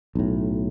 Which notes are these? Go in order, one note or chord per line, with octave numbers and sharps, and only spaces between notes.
B1 A2